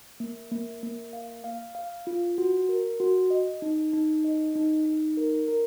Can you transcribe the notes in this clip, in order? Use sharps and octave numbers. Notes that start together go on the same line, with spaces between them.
A#3
A#3
A#3
F5
F5
F5
F4
F#4
A#4
F#4
D#5
D#4
D#4
D#5
D#4
D#4
A#4
A#4